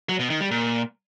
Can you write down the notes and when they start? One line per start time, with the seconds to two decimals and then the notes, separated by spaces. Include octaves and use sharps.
0.09 F#3
0.19 B2
0.30 D#3
0.41 G3
0.51 A#2